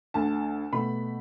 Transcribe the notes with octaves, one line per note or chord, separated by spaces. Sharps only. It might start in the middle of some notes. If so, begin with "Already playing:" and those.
D2 D3 A3 A5
B2 A3 B5